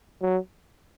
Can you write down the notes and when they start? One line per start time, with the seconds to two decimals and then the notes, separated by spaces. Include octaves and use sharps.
0.22 F#3